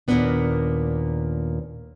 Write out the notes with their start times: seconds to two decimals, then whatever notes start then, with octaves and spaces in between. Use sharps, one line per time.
0.08 D#2 A#2 F#3 A#3 B3 D4